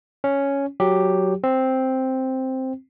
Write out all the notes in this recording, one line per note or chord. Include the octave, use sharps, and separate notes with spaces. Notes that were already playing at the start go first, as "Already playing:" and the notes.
C#4
F#3 G4
C4